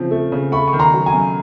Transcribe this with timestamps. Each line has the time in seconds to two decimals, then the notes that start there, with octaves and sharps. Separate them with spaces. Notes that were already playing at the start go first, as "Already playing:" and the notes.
Already playing: C#3 F3 C4
0.11 A3
0.32 C#3
0.52 A3 B5 C#6
0.68 C#6
0.73 D#3
0.79 A#5 C6
0.93 F#3
1.06 G#5 A#5
1.13 F#2